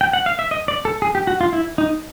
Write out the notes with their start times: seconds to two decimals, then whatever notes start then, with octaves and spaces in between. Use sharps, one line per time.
0.01 G5
0.13 F#5
0.26 F5
0.39 E5
0.51 D#5
0.68 D5
0.85 A4
1.02 G#4
1.15 G4
1.27 F#4
1.41 F4
1.53 E4
1.78 D#4